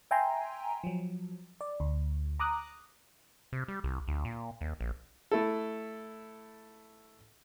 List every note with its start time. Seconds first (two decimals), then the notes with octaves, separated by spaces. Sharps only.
0.11 E5 G5 G#5 A#5 C6
0.84 F3 F#3
1.61 D5
1.80 D2
2.40 A#5 D6 D#6 F#6
3.53 C3
3.68 G3
3.84 C2
4.08 D2
4.25 A#2
4.61 D#2
4.81 A#1
5.31 A3 E4 A4